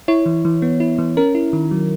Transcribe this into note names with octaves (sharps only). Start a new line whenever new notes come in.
E4 C#5
E3
E3
B3
E4
E3
C#4 A#4
E4
D#3
F#3